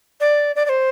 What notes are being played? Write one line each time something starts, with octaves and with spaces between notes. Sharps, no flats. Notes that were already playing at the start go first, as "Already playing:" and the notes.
D5
D5
D5
C5